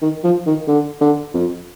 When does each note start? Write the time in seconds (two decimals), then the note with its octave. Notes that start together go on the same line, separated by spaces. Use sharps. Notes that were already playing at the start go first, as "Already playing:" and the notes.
0.02 D#3
0.24 F3
0.46 D#3
0.68 D3
1.01 D3
1.34 F2